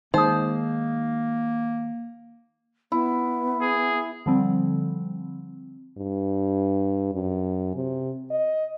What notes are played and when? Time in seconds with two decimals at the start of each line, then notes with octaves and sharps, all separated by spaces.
0.14 D#3 G#3 A#3 D#4 C5 D#6
2.92 B3 E4
3.62 G#4
4.26 D3 F3 G3 C4
5.98 G2
7.13 F#2
7.75 C3
8.31 D#5